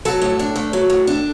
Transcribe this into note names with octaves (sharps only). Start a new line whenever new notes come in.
F#3 A4
A2
D4
A3
F#3
A2
D4